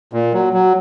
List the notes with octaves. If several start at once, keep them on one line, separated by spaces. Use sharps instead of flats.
A#2
F#3
F#3